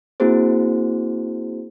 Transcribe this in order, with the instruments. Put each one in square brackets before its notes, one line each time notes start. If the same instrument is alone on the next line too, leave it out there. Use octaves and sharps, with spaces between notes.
[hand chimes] A#3 C4 E4 F#4 G#4 C5